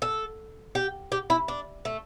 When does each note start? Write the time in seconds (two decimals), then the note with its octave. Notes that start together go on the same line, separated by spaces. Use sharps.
0.02 A4
0.75 G4
1.12 G4
1.30 E4
1.48 D4
1.85 A3